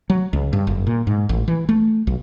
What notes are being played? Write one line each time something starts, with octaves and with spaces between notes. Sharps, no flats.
F#3
C#2
G2
F#1
A#2
G#2
A1
E3
A3
B1